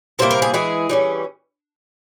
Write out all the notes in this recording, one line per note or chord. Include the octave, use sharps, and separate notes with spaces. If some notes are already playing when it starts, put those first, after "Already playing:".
C3 G3 A#3 E4 C5
A#4
G#4
E3 G#3 E4 G#4
E3 G3 C#4